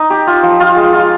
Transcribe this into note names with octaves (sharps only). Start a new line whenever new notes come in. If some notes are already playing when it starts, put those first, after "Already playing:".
Already playing: D#4
G4
F4
F3
F4
G#3
F4